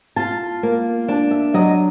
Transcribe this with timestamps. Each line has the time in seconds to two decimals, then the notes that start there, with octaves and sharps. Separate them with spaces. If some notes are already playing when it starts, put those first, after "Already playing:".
0.16 F4 A5
0.63 A#3
1.08 D4 A5
1.31 E5
1.54 F#3 D#5